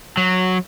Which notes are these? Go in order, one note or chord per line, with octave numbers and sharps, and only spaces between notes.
F#3